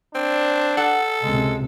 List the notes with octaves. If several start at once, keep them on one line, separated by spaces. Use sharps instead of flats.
C4 D4
A4 F#5
C#2 C3 G#3